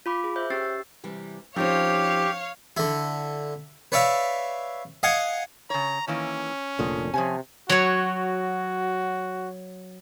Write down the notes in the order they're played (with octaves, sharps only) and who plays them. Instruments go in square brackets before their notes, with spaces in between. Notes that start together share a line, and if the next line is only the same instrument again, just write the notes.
[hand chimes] F4 B5 D6
G#4
C5 E5 G6
C#4 G4 E6 A6 C7
[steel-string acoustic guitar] C3 E3 G3
[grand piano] F3 C#4 [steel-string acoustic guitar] C4 D#4 C5 [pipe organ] G4 [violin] C#5 F5
[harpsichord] D3 E4
B4 C#5 D5 E5 F5
D#5 F5 F#5 G#5
[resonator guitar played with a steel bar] C#3 C#5 [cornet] A#5
[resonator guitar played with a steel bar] D#3 E3 A#3 [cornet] C#4
[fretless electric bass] F1 A#2 D3 [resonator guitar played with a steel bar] F3
[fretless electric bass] C3 [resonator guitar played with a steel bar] F3 C#5 G#5
[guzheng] F#3 C#5 [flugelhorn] F#4